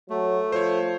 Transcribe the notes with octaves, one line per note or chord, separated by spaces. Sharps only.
F#3 A3
F3 C5 C#5